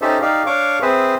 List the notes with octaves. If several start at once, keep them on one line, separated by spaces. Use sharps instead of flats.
C#4 D#4 G4 A4 C5 E5
D#4 G4 D5 F5
D4 C#5 F5 C#6 D6
C4 G#4 B4 C5 E5